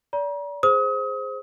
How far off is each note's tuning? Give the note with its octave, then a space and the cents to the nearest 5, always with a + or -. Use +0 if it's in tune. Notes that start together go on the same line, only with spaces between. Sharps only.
D5 -30 A#5 +40
G#4 +0 C5 +0 D#6 +35